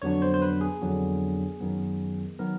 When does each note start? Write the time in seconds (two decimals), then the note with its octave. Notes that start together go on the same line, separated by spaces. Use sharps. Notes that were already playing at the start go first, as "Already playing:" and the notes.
0.02 F2 D3 F#3 B3 D4 C#5
0.22 C5
0.34 C5
0.42 B4
0.61 G#4
0.81 F2 D3 F#3 B3 D4
1.60 F#2 D#3 F#3 B3
2.39 D#3 F#3 B3 A#4